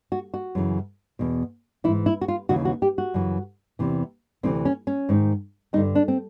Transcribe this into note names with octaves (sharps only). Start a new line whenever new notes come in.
F#4
F#4
F#2 C#3 E3
E2 B2
G#2 E3 E4
E4
F#4
F4
D#2 C#3 E3 F#4
F#4
G4
F#4
F#2 C#3 E3
E2 C3 E3
D2 C3 E3 C4
C#4
C#4
G#2 D#3
G2 D3 D#4
D4
C4